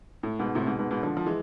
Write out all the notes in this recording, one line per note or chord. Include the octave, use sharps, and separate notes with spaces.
A2
G#2 B2
A2 C3
G#2 B2
G#2 B2
G#2 B2
D3 F3
F3
E3 G#3